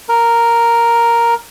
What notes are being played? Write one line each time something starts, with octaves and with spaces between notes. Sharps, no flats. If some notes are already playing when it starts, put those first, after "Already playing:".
A#4